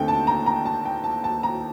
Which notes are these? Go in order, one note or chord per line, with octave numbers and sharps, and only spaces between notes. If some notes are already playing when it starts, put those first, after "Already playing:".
Already playing: D#2 D3 A3 C4 G5
A5
A#5
A#5
A5
G5
A5
A5
A#5